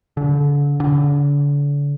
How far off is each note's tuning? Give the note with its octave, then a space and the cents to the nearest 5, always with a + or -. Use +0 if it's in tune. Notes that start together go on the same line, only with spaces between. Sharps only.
D3 -35
D3 -40